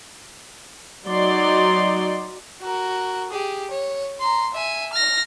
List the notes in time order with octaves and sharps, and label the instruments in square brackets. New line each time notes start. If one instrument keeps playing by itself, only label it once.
[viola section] F#3 D#4 D5 C6
[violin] F#4 A#4
G4 G#4
C#5
A#5 C6
E5 G#5
F6 A#6